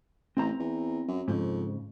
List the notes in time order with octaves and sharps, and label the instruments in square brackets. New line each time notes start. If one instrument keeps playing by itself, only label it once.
[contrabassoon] A1 [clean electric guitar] C4 A#5
[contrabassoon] E2
F#2
[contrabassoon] F2 [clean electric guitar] G#2 C#3